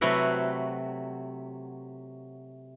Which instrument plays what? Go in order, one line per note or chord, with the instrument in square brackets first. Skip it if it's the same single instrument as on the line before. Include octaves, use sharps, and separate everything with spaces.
[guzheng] C3 F#3 A3 E4 F#4 B4